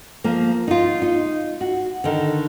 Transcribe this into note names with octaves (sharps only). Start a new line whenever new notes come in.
F3 A#3
D#4 F4
D#4
F#4
D3 D#3